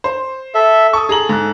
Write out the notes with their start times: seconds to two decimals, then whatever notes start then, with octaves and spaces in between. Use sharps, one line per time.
0.04 C5
0.55 A4 E5
0.93 A4 C#6 D#6
1.09 G#4 A#5 F#7
1.29 G#2 F#6